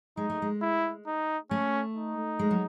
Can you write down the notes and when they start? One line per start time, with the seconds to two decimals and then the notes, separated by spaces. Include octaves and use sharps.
0.17 G#3 D#4
0.30 A3
0.42 G#3
0.62 E4
1.07 D#4
1.50 A3 C#4
1.95 D#4
2.39 G#3
2.51 F#3